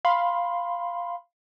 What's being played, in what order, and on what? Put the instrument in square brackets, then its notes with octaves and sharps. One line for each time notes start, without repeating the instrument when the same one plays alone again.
[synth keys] F5 B5 C6